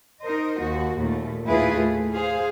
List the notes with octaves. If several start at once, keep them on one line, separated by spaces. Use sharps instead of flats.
D#4 A#4 C5 D#5
D#2 F#4
D#2 A#2 A3
D#2 A2 E4 F4 G#4 B4
A3
G#4 C5 F5